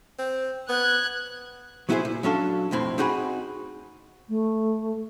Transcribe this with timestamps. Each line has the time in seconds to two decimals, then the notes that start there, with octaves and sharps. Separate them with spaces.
0.19 C4
0.69 B3 F#6 G#6
1.89 F#3 B3 E4 F#4 G#4 C5
2.05 A#2
2.23 F#3 C#4 D4 A4 F5
2.71 B1 F2 A2 C4 E4
2.98 C4 D#4 F#4 G#4 F#5 B5
4.29 A3